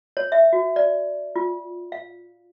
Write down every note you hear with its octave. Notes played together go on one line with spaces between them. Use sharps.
C#5
E5
F#4
D5
F4
F5